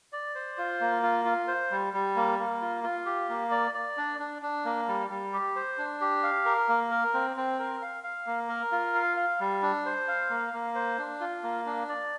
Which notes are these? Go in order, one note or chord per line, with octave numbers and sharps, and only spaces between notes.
D5
C5
F4
A#3
F4
F4
C5
G3
G3
A#3
A#3
F4
F4
G4
A#3
D5
D5
D4
D4
D4
A#3
G3
G3
G4
C5
D4
G4
F5
A#4
A#3
A#4
C4
C4
A#4
F5
F5
A#3
A#4
F4
F5
F5
G3
D4
C5
F5
A#3
A#3
C5
D4
F4
A#3
D4
D5